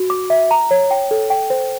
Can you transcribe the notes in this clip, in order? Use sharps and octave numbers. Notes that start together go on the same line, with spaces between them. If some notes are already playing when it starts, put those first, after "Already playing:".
Already playing: F#4
D6
E5
A#5
C#5
G5
A4
G5
C5